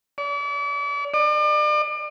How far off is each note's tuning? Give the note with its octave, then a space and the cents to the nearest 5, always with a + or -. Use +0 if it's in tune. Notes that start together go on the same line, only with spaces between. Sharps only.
D5 -40
D5 +40